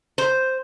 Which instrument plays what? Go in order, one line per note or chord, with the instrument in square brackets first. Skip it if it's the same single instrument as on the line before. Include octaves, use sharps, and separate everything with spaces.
[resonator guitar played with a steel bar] C5